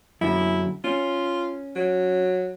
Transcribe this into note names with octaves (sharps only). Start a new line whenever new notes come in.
F#2 D3 E4
C#4 F4
F#3